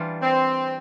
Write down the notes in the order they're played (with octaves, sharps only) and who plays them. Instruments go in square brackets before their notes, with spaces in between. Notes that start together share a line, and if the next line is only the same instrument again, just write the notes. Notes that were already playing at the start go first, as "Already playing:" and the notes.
Already playing: [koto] E3 G3 D4 F4
[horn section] C4